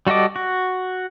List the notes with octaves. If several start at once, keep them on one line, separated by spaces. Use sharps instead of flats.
G3 F#4 A4 D#5 D6
F#4